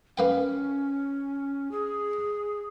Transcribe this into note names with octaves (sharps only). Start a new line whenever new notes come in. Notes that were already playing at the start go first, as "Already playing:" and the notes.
A#3 C#4 B4 G5
G#4